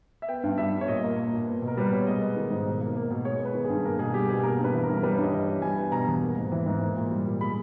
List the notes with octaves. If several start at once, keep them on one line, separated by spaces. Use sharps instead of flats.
E5
B3 G5
G2
G3 E5
G2
C#5
A#2 D#5
A#3
A#3
A#2
B3
B2
A#4
G3 B4
B2 C#5
G#3 D#5
B3
D#3
G#2
B2
A#3
A#3
B2
G#3 C#5
B3
B4
D#3
G#4
G2
A#3 A#4
B2 G#4
G3 G4
B2 G#4
A#3 A#4
G2 B4
E3
A#4
G2
A#4
G3 B4
C#5
G2 D#5
E3
C#5
G2
G3 G#5
B3
B2 A#5
E2
A#3
G#2
E3
G#2
A#3
A#2
G3
A#2
G#3 B5